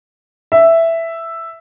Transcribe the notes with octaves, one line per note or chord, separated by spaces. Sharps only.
E5